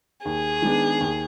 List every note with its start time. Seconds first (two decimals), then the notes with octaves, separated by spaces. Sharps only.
0.25 D#2 G#4
0.62 D#3 G#3 B3 D4
1.00 D#2